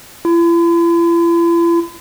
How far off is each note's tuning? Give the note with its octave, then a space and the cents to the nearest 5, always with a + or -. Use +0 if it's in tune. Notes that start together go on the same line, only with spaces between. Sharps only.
E4 +45